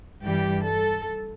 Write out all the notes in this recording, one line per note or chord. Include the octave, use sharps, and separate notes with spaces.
G2 E3 G3 G4
A4